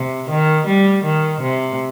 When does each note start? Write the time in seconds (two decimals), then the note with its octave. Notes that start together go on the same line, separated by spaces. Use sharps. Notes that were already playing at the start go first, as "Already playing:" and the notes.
Already playing: C3
0.30 D#3
0.67 G3
1.04 D#3
1.42 C3